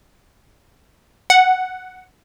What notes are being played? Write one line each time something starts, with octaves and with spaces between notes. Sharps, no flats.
F#5